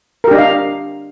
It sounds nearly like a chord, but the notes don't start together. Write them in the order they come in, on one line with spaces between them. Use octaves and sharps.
A#4 G4 D4 D#5 F5